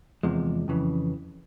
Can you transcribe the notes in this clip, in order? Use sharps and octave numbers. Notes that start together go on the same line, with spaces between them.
E2 C3 F3 G#3
F2 C#3 E3